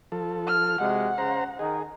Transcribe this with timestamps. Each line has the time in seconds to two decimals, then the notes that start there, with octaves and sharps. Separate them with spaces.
0.12 F3 A4
0.47 F6
0.81 C3 G#3 F#4 F#5
1.18 C#3 C5 A#5
1.59 D#3 D#4 G#4